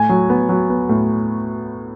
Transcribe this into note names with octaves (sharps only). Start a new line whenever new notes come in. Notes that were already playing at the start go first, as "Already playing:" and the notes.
Already playing: A2 G#5
F#3
B3
F#3
B3
A2